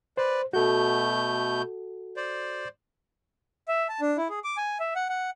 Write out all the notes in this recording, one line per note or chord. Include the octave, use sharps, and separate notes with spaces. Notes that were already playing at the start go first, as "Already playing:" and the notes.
B4 C5 D5
B2 A3 F#4 A4 G6
C5 D5
E5
A5
D4
E4
G#4
D6
G#5
E5
F#5
F#5